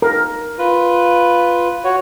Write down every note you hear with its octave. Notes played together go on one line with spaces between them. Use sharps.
A#4
F4 B4
F#4 C#5